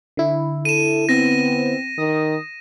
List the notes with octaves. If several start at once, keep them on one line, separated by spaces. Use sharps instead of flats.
D3 E4
A4 D#7 E7
B3 C4 A#6
D#3 D#6